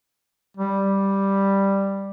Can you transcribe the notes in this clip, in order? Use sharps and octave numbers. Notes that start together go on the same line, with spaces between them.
G3